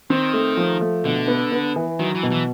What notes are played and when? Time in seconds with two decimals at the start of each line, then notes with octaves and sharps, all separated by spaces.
0.10 D#3 C4
0.34 A3
0.57 F3
0.81 A3
1.05 B2 D3
1.28 B3
1.52 B3
1.76 E3
1.99 D#3 F#3
2.15 E3
2.23 B2
2.32 E3